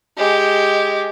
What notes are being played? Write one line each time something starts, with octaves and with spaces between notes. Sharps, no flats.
G#3 G4